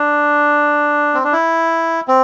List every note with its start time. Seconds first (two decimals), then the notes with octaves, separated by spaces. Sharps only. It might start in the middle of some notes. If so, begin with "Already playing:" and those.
Already playing: D4
1.14 C4
1.24 D4
1.33 E4
2.08 C4